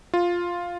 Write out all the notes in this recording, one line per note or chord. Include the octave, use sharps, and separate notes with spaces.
F4